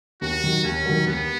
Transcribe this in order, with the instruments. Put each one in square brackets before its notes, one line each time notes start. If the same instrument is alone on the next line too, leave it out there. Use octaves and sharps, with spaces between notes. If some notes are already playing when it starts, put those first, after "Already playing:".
[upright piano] D#2 [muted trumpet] F#4
[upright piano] D#3 F#3
[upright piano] D#2 [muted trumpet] C#4
[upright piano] D#3 F#3
[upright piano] D#2 [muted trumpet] B3